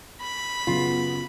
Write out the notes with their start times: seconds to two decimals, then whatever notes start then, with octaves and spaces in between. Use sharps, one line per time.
0.21 B5
0.67 F#2 C#3 B3 F4